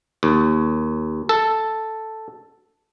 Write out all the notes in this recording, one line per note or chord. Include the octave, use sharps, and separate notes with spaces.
D#2
A4